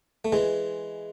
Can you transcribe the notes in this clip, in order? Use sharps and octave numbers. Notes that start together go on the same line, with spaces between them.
A3
E3 G#3